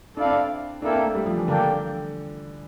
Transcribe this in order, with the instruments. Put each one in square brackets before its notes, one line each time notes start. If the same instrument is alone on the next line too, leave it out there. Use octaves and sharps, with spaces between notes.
[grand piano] D4 [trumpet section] E4 A4 D5 F5
[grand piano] C4
D4
[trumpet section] A#3 E4 A4 E5 G5 [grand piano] D4
[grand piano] C4
A3
G3
F3
E3
[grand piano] D3 [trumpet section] A#3 D4 A4 D5 G5